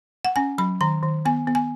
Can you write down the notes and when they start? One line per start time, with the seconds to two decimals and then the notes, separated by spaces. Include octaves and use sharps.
0.25 F#5
0.36 C#4 G#5
0.58 F#3 B5
0.81 D#3 A#5
1.03 D#3
1.25 B3 G#5
1.47 B3
1.55 G#5